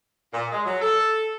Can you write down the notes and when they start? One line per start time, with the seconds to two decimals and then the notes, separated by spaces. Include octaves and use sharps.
0.32 A#2
0.52 G#3
0.65 F#3
0.81 A4